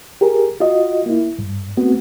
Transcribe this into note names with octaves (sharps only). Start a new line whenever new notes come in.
G4 G#4 A#4
F4 F#4 D#5
A#3 E4
G2
A3 B3 C4 F#4